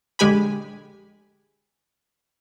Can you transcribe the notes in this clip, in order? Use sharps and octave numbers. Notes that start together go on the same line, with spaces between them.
A#1 D3 G#3 G4 G#5 B5